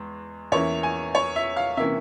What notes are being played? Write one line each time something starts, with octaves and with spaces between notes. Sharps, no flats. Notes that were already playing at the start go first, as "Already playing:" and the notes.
Already playing: E2 G#3
E2 E3 A#3 C#4 E4 C#5
G#5
C#5
E5
F5
C3 E3 A#3 C#4 E5